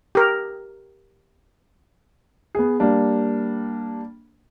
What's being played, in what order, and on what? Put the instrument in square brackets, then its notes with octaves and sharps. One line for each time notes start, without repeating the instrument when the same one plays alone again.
[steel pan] G4 A#4
[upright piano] B3 G#4
G3 A#3 D4